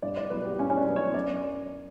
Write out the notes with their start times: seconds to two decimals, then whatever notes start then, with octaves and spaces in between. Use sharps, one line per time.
0.02 G2 D5
0.17 D5
0.30 F#3 B3 B4
0.45 G4
0.58 G2 C#4
0.70 C#4
0.77 D4
0.87 F#3 B3
0.96 C#5
1.14 F#2 D5